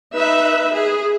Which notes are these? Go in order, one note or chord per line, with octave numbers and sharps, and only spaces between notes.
D#4 B4 E5
G#4